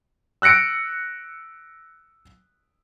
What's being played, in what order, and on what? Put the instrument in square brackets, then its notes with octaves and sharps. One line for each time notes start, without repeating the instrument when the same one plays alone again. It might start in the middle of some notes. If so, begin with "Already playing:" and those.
[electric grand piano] E6 F#6 A#6 C#7 D7